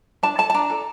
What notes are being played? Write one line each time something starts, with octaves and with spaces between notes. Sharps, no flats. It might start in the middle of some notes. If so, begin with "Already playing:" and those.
D4 A5
A4 A5
A5
D4 A#5
A4